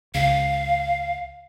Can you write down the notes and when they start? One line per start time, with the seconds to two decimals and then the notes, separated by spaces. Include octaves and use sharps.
0.14 C#2 F5